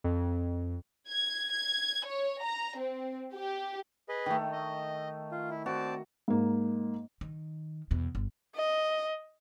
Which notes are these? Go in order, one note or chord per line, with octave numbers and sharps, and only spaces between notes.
F2
G#6
G#6
C#5
A#5
C4
G4
G#4 B4 D#5
D#3 A3
D#5
F4
E4
C4 F#4 D5 A5
G#2 A#3
D#3
E2 B2
G1
D#5